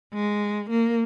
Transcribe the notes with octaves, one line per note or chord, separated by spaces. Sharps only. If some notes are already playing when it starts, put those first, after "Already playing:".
G#3
A#3